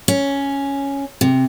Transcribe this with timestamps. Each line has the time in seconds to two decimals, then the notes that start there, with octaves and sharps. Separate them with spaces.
0.08 C#4
1.21 C3